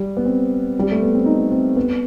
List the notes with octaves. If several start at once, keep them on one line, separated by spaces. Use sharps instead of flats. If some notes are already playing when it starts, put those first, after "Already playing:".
Already playing: G3
B3
C4
G3
A3
B3
C4
D#4
C4
B3